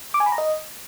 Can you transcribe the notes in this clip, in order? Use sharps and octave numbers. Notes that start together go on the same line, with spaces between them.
D6
G#5
B5
A#5
D#5